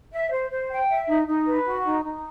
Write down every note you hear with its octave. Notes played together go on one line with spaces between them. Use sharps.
E5
C5
C5
G5
E5
D#4
D#4
B4
F#4
D#4
D#4